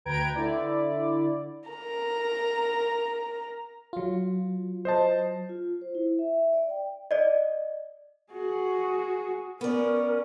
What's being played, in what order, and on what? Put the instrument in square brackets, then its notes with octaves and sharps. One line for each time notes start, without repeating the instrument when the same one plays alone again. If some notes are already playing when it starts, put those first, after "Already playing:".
[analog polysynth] D2 B4 G5 A#5 G#6 D7
D3 E4 D5
[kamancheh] A#4 A#5
[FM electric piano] F#3 F4
[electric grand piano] C5 D#5 A5
[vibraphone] F4
C5
E4
E5
D5
G5
[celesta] D5 D#5
[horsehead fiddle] F#4 G#4
[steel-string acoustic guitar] B3 D5 [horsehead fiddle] C#4 [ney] A#4